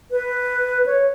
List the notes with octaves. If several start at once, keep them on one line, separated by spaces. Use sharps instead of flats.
B4
C#5